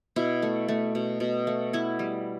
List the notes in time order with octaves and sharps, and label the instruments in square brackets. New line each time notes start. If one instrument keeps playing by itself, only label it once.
[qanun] B2 E4
A3
A3
B2
B2
A3
B3 E4
G3